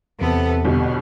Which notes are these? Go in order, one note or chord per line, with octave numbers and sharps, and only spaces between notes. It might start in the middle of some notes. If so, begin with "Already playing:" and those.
E2 C3 B3 A4
G1 B2 G3 B3